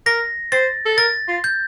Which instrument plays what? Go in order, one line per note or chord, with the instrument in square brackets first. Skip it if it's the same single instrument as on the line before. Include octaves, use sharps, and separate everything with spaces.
[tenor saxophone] A#4 [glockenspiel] A#6
[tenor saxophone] C5 [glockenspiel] A6
[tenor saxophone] A4
[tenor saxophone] A#4 [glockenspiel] A6
[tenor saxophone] F4
[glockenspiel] G6